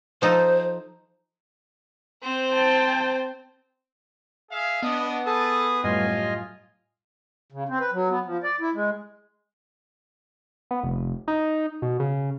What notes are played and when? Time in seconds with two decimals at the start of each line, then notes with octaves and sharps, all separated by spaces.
0.22 F3 D#4 A4 C5
2.22 C4 C5
2.53 G5 A5
4.52 G#4 E5 F5
4.82 B3 D4 D#5 D#6
5.26 G#4 A4 B4 A5 D#6
5.84 F#2 A2 G3 F4 D#5 G#5
7.52 C#3
7.69 C4
7.80 B4
7.92 F#3
8.09 B3
8.25 F3
8.43 D5
8.61 E4
8.74 G#3
10.71 B3
10.83 F1
11.28 D#4
11.82 B2
12.00 C#3